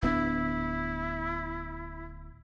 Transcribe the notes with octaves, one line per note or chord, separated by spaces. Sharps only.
D1 B3 D4 E4